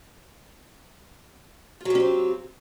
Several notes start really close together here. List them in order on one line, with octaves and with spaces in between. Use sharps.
F4 F#3 G4 C#4 C4